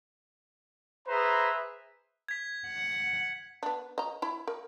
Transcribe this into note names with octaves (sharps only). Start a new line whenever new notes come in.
G#4 B4 C5 E5 A#5
G#6 B6
F#5
B3 D4
D#5 A#5
E4 B5
A#4